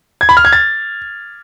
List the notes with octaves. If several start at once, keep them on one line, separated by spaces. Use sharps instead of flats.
G#6
B5
F6
G#6
A6